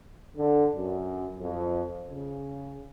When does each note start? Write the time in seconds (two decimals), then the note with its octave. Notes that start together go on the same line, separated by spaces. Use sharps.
0.37 D3
0.76 F#2
1.40 F2
2.10 C#3